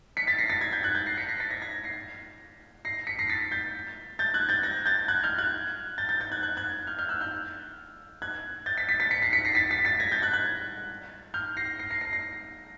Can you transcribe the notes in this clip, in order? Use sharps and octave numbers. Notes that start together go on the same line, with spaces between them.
B6 C#7
A6 B6
A#6 C7
A6 B6
G#6 A#6
G6 A6
F#6 G#6
G6 A6
A#6 C7
B6 C#7
A#6 C7
A6 B6
G#6 A#6
G#6 A#6
A#6 C7
A#6 C7
B6 C#7
A#6 C7
A6 B6
G6 A6
G6 A6
F#6 G#6
G6 A6
G#6 A#6
G6 A6
F#6 G#6
F6 G6
F#6 G#6
G6 A6
G6 A6
G6 A6
F#6 G#6
F#6 G#6
F#6 G#6
F6 G6
F6 G6
E6 F#6
F6 G6
F#6 G#6
G6 A6
A6 B6
A6 B6
A6 B6
B6 C#7
A#6 C7
B6 C#7
A#6 C7
A6 B6
A6 B6
A6 B6
G#6 A#6
G6 A6
F#6 G#6
F#6 G#6
F6 G6
A#6 C7
A#6 C7
A#6 C7
A#6 C7
A#6 C7